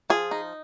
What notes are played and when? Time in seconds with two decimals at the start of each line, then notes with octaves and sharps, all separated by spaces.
0.10 F3 G#4
0.31 D#4